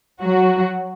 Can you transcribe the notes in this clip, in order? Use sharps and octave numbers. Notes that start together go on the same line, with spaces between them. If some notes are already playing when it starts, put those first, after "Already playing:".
F#3 F#4